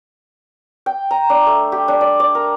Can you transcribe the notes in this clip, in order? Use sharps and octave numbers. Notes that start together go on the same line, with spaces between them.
G5
A#5
D4
A3
G4
D4
D5
D5
A#4